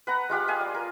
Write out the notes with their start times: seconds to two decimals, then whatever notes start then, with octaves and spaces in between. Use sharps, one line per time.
0.07 B4 F#5 A#5
0.30 G#3 F4 G4 F#5
0.48 D#5 F5 G#5
0.61 D5
0.75 A#4